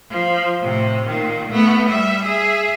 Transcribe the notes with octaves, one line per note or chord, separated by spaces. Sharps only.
F3
A2 C3
A#2 D#3
A3 B3
G3 E5
G#4 E5